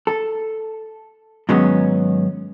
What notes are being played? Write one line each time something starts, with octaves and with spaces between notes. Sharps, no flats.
A4
G#2 D#3 F#3 G#3 B3 C#4